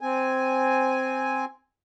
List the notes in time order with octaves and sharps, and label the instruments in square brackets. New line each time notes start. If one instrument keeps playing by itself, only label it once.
[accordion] C4 G#5